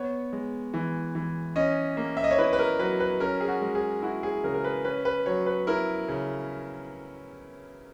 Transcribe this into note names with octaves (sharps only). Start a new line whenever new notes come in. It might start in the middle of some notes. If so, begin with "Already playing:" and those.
Already playing: B3 C#5
G#3
E3
E3
C#4 D#5
A#3
E5
D#5
C#5
E4 B4
B4
A#4
F#3 B4
B4
C#4 A#4
G#4
F#4
G#3
G#4
E4 F#4
G#4
C#3 A#4
A#4
B4
C#4 B4
B4
F#3 C#5
B4
E4 A#4
C#3